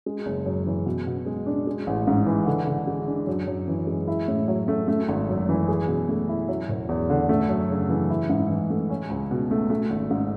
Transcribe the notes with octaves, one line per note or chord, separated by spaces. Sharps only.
G#3
F#1
F#2
E3
B2
B2
G#3
D4
G#3
A1
G#2
E3
D3
D3
G#3
D4
F#2
F#2
E3
G#3
E4
A2
F#3
A3
A3
G#1
F#2
E3
G#4
B2
A3
E4
F#3
E1
E2
D3
A3
F#2
C#3
E3
E4
G#2
E3
A3
C#4
C#2
B2
A3
A3
G#1
G#2